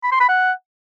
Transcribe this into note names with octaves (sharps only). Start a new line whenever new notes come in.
B5
C6
B5
F#5